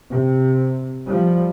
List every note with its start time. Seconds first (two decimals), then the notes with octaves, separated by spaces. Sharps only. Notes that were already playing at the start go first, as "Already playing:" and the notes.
0.12 C3
1.09 F3 G3